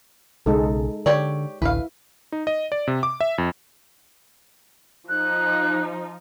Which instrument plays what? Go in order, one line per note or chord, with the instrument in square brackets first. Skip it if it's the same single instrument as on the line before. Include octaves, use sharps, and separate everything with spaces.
[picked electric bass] B1 C#3 [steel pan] G#3 D#4 A4
[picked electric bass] D3 [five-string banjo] G4 C#5 D5
[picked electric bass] A1 D2 [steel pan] E4 [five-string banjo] B4 F5
[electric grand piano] D#4
D#5
D5
C3
D6
E5
F2
[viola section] F3 D#4 [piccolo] F#6